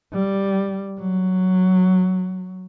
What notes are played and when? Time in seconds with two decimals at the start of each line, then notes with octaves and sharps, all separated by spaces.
0.13 G3
1.00 F#3